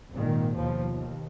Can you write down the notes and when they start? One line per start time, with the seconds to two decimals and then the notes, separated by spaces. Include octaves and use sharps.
0.13 G#1 A#2 D#3
0.57 D#2 B2 F3
0.94 D#2